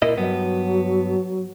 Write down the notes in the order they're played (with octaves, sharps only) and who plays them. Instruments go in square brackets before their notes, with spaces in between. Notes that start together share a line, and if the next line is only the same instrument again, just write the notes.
[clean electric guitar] A#2 E4 D#5 [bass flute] A#4
[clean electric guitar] G2 B3 [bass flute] F#3